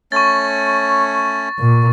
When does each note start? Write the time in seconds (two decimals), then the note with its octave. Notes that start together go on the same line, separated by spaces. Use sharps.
0.12 A3 C#4 C#5 C#6 A6
1.59 A#2